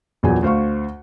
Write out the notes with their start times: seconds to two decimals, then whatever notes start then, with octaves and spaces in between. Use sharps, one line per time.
0.23 A#1 E2 A#2 F#3 G#4 G#5
0.43 D2 C5 F5 C#6